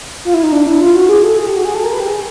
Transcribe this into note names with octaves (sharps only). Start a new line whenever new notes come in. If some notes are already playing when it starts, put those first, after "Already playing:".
F4
E4
D#4
D4
E4
F4
F#4
G#4
A4
G#4
G4
F#4
G#4
A4
A#4
B4
G4
G#4